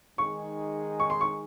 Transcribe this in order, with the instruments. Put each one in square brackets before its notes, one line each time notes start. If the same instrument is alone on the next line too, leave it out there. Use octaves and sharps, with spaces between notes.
[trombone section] D#3 G#3 D#4 G#4 [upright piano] C#6
[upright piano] C#6
C6
C#6